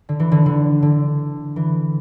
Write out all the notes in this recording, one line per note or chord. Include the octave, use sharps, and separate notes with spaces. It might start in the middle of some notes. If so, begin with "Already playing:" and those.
D3
E3
D3
D3
D3
E3